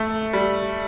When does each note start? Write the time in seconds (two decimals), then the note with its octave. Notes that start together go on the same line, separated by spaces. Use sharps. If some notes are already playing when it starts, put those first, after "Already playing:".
Already playing: A3
0.33 G3